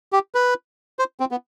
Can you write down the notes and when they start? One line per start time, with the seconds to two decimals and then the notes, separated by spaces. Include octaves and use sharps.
0.12 G4
0.35 B4
0.99 C5
1.20 C4
1.31 B3